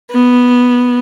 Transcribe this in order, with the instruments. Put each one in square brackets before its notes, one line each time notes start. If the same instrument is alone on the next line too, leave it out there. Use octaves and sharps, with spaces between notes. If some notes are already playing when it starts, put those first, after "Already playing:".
[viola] B3